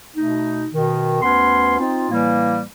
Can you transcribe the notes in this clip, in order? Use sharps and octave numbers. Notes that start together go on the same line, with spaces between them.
B2 A3 D#4
B2 D#3
D2 B3 C#4 B4 C6
C4 D#4 F4
A2 E3 G3 A#3